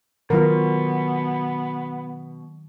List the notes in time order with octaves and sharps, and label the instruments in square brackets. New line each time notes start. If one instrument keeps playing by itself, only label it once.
[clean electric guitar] B2 [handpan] D#3 F#3 [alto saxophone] B3 [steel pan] F4 A#4